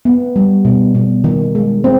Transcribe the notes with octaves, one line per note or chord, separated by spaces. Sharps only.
B3
G3
B2
B2
D#3
G#3
C4